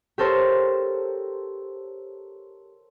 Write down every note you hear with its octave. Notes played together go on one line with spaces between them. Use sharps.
G4 A4 A#4 C5 C#5